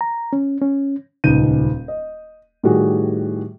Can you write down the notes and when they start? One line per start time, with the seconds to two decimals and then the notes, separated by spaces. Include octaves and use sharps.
0.01 A#5
0.33 C#4
0.61 C#4
1.24 D#1 C#2 D#4 G6 D#7
1.88 D#5
2.63 A2 D#3 G3 F#4 G#4